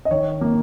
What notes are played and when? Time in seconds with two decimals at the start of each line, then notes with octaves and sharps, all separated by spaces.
0.05 D#5
0.11 D#3 C#5
0.41 A#3